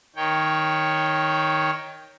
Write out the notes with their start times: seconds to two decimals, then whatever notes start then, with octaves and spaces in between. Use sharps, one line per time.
0.16 D#3 C#5 G5